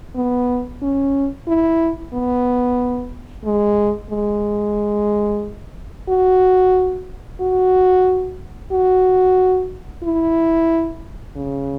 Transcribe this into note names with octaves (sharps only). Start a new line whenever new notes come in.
B3
C#4
E4
B3
G#3
G#3
F#4
F#4
F#4
E4
C#3